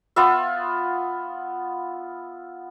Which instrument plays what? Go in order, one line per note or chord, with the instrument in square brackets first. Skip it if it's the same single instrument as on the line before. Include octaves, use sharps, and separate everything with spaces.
[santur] B3 F4 E5